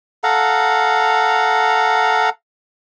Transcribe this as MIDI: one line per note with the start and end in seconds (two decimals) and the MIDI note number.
0.24 2.29 69
0.24 2.29 77
0.24 2.29 78
0.24 2.29 82